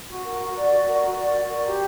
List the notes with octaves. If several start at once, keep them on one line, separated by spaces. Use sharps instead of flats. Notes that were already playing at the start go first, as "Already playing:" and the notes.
F#4
A#4
F#4
D5
F#4
A#4
F#4
D5
F#4
A#4
G4